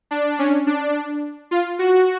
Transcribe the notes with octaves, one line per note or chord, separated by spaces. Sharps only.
D4
C#4
D4
F4
F#4